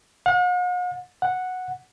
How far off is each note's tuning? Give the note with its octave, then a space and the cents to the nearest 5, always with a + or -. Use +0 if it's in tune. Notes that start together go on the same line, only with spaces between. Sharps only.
F#5 -45
F#5 -5